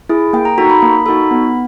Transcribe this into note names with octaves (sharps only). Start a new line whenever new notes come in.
E4 G#4
A#3 G5
A#5
D#4 F#4 A4 A#5
B5
A#3 B5
D#4 F#4 A4 B5
B3